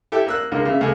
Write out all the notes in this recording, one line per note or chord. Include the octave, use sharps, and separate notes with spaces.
E4 G4 A4 G5
A#3 E6 F#6
C#2 D3 A#3
C#3 E5
C#2 A3 G#5